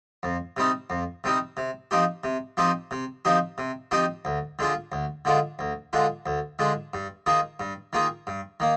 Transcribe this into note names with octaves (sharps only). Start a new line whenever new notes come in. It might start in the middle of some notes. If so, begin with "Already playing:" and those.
F2
C3 G3 C4 D#4
F2
C3 G3 C4 D#4
C3
F3 C4 D#4 G4
C3
F3 C4 D#4 G4
C3
F3 C4 D#4 G4
C3
F3 C4 D#4 G4
D2
D3 G#3 D4 F4
D2
D3 G#3 D4 F4
D2
D3 G#3 D4 F4
D2
D3 G#3 D4 F4
G2
D#3 A#3 F4 G#4
G2
D#3 A#3 F4 G#4
G2
D#3 A#3